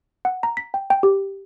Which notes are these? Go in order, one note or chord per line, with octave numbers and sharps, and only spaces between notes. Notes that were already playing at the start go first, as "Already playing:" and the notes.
F#5
A#5
B6
G5
G5
G4